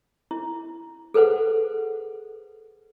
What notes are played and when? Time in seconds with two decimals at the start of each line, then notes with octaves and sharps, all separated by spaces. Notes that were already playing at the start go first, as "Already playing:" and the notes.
0.31 E4
1.14 G#4 A4 B4 C5 F#5